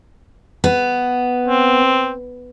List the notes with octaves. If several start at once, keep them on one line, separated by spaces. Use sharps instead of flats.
B3
C4